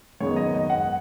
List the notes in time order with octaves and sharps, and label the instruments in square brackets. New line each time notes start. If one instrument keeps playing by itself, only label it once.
[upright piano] F#2 D#3 G#3 B3 D#4 C#5
D#5
D#5
F#5